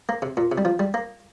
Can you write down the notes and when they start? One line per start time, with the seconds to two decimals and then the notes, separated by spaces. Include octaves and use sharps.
0.09 A#3
0.22 C3
0.37 A#2
0.52 C3
0.58 G3
0.65 F3
0.79 G3
0.94 A#3